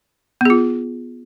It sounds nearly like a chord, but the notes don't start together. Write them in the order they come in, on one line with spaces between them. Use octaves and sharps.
B3 G#4 F4